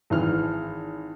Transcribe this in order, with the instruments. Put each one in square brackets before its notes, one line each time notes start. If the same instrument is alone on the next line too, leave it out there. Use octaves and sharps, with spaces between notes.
[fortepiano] G#1 E3 F6